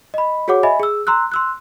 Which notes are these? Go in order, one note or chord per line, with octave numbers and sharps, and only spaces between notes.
D#5 B5
F#4 G#4 C#5 F#5 D6
D#5 E5 G#5 B5
G#4 E6
A#5 C6 E6 F#6
C6 E6 F#6